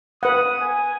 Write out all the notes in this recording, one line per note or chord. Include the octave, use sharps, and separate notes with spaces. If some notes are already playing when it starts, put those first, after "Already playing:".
B4 F#5 D#6
G#5